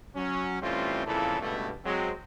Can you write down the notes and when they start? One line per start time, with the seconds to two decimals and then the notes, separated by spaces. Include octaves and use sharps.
0.16 F#3 C#4
0.62 E3 G3 A3 C4 C#4 F4
1.07 F2 A#2 C#3 E3 E4 A4
1.41 C#2 G2 B2 A3
1.85 F#3 G#3 C4